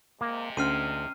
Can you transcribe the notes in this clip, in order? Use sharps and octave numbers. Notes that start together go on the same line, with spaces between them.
C3 G#3 A#3
D2 C#4 C6 F6 C7 D#7